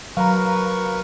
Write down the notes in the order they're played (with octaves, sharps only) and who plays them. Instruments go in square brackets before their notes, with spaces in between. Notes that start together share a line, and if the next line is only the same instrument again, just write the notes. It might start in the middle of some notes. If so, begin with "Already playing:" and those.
[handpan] F#3 [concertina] A#4 B4 C#6 [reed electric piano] F5 A#5